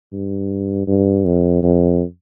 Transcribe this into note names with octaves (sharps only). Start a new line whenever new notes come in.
G2
G2
F2
F2